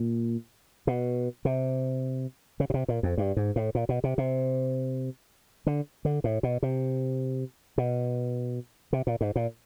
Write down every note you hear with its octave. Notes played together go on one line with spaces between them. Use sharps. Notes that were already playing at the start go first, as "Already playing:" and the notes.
Already playing: A#2
B2
C3
C#3
B2
C3
A#2
F2
G2
G#2
A2
A#2
B2
C3
C3
D3
D3
A2
B2
C3
B2
C3
A#2
G#2
A#2